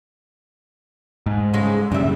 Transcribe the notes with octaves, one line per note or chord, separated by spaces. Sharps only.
G#2
A2 C#3 G#3
F#2 C#3 G3 E5